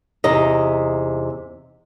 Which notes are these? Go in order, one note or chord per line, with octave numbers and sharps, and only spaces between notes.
E2 C3 D#4 D#5